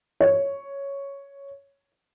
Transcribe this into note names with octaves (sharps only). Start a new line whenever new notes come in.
C#5